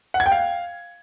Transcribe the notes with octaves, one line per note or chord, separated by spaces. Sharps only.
F#5
G#6
G5
F5